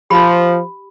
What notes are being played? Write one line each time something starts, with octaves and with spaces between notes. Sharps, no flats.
F3 G4 B5